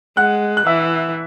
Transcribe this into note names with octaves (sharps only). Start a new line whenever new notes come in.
G#3 F#5 F#6
F#6
E3 E5 E6